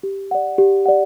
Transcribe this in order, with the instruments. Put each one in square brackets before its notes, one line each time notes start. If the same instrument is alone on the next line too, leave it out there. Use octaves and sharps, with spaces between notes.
[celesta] G4
D5 F#5
G4
D5 F#5